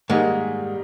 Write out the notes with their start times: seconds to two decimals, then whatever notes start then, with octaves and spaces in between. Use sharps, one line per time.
0.09 G#2 D#3 G3 G#3 A#3 D#4